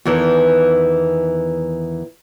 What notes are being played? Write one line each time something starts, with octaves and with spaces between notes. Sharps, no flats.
E2 D#3 E3 A4